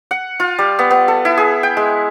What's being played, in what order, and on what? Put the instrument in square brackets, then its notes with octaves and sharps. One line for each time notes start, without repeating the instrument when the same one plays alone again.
[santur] F#5
F4
G3
B3
B3
A4
E4
G#4
G5
G#3